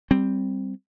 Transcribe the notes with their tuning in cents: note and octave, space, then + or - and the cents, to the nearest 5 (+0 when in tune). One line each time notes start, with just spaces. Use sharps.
G3 +0 C4 +0